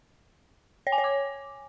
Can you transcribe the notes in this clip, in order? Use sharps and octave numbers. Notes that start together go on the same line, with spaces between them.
C#5
G#5
C#5
D6